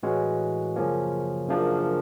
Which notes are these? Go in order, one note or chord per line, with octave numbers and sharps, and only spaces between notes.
A2 E3 G#3 C#4 F#4
F#2 C#3 F3 A#3 C#4
F#2 C#3 F3 A#3 D4